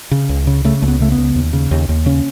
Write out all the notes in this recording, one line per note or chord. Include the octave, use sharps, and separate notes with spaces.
C#3
C#2
C#3
C#3 A3
C#2 A3
B3
C#3 A3
B3
C#2
D#2
C#3
D#2
D#2
C#3 C#4